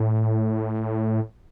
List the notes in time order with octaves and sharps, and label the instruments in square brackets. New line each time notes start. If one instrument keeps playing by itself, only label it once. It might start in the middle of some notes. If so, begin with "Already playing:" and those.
Already playing: [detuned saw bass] A2